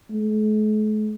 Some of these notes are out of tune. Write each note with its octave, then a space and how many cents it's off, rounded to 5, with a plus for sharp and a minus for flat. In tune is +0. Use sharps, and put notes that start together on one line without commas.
A3 -45